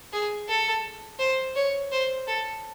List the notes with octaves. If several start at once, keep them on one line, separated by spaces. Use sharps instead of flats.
G#4
A4
C5
C#5
C5
A4